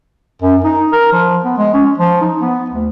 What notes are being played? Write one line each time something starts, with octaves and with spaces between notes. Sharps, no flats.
F#2
D#4
A#4
F3
B3
G#3
C#4
F3
D#4
B3
D2